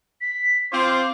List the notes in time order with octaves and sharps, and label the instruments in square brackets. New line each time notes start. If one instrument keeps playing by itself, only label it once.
[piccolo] B6
[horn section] C4 F4 [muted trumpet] C5 [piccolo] D6